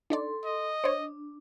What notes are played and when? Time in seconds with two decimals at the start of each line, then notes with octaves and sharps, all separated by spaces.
0.10 D4 D#4 A4 D5 C6
0.45 D#5
0.84 D4 C5 C#5